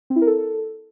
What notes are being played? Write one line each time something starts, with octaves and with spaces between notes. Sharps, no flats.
C4
E4
A#4
A4